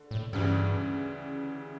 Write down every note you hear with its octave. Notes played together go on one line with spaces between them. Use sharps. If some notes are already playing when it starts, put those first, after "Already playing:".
Already playing: D3 A3
A2
D2 G2 C#3 E3 G3